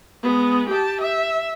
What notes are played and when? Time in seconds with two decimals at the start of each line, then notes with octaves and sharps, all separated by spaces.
0.23 G#3 B3
0.70 G4 A5
1.01 E5